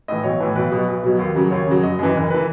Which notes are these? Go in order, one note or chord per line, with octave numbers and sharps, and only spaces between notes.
A2 E3 D#5
B1 C#5
A2 E3
B1 B4
B2 F#3
B1
B2 F#3
D#2
C#3 F#3
D#2 C#5
C#3 F#3
F#1 D#5
F#2 E3
F#1
E3 B4